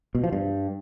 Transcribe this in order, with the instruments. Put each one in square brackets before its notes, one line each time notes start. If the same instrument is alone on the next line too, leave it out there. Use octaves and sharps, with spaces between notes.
[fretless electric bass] B2
F3
G2